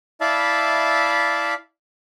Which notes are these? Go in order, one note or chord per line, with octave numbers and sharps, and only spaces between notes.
E4 D5 E5 F5 A5 B5